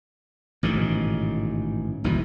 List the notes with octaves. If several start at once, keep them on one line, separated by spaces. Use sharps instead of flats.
A1 G#2 B2 D#3
G1 D#2 B2 E3